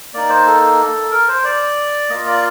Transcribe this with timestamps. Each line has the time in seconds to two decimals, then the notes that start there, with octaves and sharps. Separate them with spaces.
0.14 A#3 D#4 D5
0.29 C5
0.46 A4
1.11 A#4
1.28 C5
1.44 D5
2.09 A#3 F4 D#5
2.27 D5